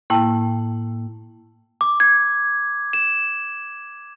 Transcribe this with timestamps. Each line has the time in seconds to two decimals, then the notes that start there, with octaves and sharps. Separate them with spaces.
0.10 A2 A#3 E4 G5 A5
1.81 D6
2.00 G#6
2.93 E7